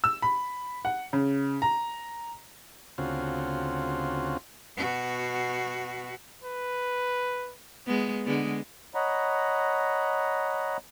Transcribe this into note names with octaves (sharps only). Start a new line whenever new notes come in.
E6
B5
F#5
C#3
A#5
D2 C#3 C4 F4 F#4
B2 F#4
B4
G#3 B3
D3 G#3 B3
C#5 D#5 F#5 A#5 B5